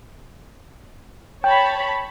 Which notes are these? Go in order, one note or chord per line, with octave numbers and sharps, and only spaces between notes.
C#5 G5 A5 B5